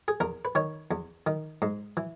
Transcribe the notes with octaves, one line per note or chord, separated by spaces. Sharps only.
G#4
E2 A#4
B4
D#3 C#5
E2
D#3
G#2
E3